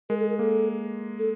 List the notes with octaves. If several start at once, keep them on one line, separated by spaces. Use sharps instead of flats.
G#3 A#4
A4
A#4
A#3 A4
A4